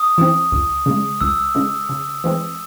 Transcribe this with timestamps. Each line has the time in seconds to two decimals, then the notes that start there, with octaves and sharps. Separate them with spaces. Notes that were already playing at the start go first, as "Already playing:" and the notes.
Already playing: D#6
0.18 E3 C4
0.52 C#2
0.86 C#3 G#3
1.21 C#2 E6
1.55 C#3 G#3
1.89 C#3
2.24 E3 G#3 C4